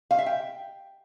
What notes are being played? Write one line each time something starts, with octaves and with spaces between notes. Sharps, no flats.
F5
E5
G5